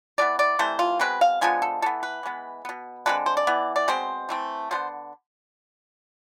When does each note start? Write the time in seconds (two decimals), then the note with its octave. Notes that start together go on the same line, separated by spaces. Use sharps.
0.18 E3 G#3 B3 D5
0.39 D5
0.59 C3 E3 A3 C5
0.79 F4
0.99 B2 G#3 C4 B4
1.21 F5
1.41 D3 F3 G#3 B3 G#5
1.62 A4
1.82 E3 B3 A4
2.03 B4
2.23 E3 G#3 B3
2.65 B2 B3
3.06 D3 G#3 C4 B4
3.26 C5
3.37 D5
3.47 E3 B3
3.76 D5
3.88 B2 G#3 C4 C5
4.29 E3 A3 C4
4.71 D3 G#3 B3 C5